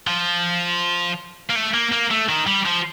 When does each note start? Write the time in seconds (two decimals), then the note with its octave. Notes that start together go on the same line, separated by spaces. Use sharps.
0.07 F3
1.50 A#3
1.55 A3
1.74 A#3
1.92 A#3
2.11 A3
2.29 D#3
2.47 G3
2.66 F3